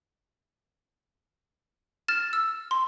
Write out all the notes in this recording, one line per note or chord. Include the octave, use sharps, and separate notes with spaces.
F6 A6 E7
E6
C6